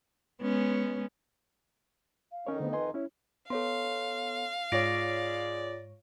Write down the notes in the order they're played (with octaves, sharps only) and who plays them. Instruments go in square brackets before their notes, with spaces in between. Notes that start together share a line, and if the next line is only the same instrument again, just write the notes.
[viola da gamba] G#3 B3 C#4
[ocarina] F5
[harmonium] F2 D#3 D#4 [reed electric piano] C#4 A#4 C#5
[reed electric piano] D3 A3 B3 [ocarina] C5
[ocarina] B4 [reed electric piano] D#5 G#5 C6
[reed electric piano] C#4 E4 [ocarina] C#5
[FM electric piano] B3 [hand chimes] A4 C#5 C6 [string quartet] F5
[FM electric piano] G#2 C#5 [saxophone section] G#3 D5 [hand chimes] F4 A#6 D7